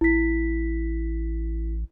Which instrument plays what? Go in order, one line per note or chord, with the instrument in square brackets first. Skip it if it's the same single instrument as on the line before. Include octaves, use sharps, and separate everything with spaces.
[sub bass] A1 [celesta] E4 B6